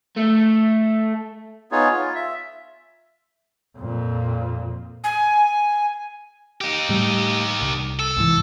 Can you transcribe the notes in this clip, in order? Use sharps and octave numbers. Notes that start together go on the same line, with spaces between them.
A3
B3 D#4 F4 G#4 C#5
F4
E5
F2 A#2
G#5
D#4 G4
A2 G3
C2
A4
C2 G#2 E3